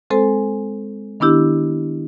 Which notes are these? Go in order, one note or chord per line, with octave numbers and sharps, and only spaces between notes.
G#3 C4 A4 C5 G#5
D#3 B3 D4 E4 G4